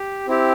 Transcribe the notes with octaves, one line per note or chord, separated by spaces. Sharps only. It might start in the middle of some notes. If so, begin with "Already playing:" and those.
Already playing: G4
C4 E4 G4